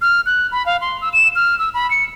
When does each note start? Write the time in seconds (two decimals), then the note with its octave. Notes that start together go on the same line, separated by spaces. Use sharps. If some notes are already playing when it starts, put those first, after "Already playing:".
0.01 F6
0.26 F#6
0.52 B5
0.66 F5
0.81 C6
1.02 E6
1.13 E7
1.35 F6
1.59 E6
1.74 B5
1.91 C#7